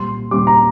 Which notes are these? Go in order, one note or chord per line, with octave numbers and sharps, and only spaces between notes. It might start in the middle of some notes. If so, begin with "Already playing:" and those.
Already playing: A#2 G3 C6
A#2 G3 D6
A#5